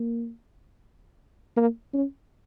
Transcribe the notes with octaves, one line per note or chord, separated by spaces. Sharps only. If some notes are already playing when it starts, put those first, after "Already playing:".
Already playing: A#3
A#3
C#4